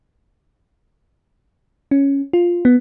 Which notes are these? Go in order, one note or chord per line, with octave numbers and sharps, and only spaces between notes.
C#4
F4
B3